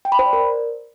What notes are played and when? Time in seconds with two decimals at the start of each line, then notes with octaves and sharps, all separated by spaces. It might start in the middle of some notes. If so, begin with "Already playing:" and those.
0.05 G5
0.12 B5
0.19 C5
0.26 D5
0.33 A#4